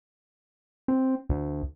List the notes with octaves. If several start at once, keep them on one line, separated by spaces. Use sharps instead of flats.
C4
D2